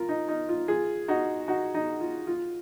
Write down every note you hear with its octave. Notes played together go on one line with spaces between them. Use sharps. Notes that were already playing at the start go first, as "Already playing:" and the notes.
Already playing: F4 A#4
D#4
D#4
F4
F4 G#4
D#4 F#4
D#4 F#4
D#4
F4
F4